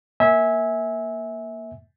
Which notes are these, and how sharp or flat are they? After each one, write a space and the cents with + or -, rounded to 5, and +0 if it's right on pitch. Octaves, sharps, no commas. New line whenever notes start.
A#3 +0 E5 -20 G#5 -5